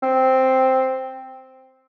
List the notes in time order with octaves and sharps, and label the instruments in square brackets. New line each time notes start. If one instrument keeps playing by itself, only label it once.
[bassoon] C4